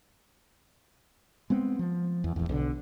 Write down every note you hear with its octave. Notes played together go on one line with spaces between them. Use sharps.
G#3 B3 C4
F3
E2
D1 E2
B1 D3